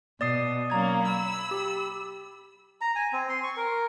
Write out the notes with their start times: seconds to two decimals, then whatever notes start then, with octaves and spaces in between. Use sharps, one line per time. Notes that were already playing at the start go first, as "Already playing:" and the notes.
0.21 B2 D5 D#6 C7
0.70 F#3 A#3 C#4 A#5 G#6
1.05 B5 E6
1.51 G4
2.81 A#5
2.96 G#5
3.13 C4
3.29 C6
3.43 C#6
3.57 A#4